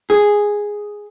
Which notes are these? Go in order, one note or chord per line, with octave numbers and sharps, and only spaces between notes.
G#4